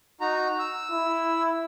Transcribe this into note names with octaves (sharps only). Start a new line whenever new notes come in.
D#4 F#4 A#5
E6
E4